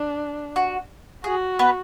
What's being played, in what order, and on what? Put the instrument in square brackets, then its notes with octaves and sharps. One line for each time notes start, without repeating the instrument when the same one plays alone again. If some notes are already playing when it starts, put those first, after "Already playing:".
Already playing: [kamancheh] D4
[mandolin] F#4
[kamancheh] F#4 [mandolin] G#4
[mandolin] B3 B4